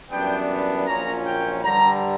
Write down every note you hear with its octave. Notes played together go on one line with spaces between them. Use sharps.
F#2 E3 G3 B3 D4 G5
A#1 A#2 F#3 C#4 A#5
G5
G2 D3 G3 A#5